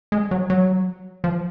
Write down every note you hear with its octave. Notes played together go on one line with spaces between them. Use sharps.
G#3
F#3
F#3
F3